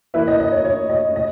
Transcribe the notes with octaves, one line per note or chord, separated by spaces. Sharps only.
E3 A#3 E4 B4 E5
D#5
D#5
C#5
C#5
D#5
D#5